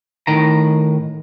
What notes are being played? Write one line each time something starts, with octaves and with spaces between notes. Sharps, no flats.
A2 D#3 A#5